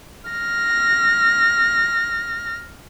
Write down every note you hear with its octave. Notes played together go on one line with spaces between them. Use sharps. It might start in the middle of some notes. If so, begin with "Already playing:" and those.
F6 A#6